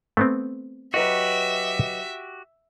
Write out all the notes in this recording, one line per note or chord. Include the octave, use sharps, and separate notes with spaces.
A3 B3 C4
F#3 F#4 G4 B4 D#5 E5